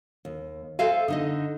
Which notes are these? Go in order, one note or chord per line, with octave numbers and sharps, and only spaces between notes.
D#2
A4 C5 E5 F5 G#5
D3 D#4 D#5